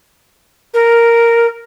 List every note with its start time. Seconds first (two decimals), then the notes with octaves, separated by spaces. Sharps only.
0.74 A#4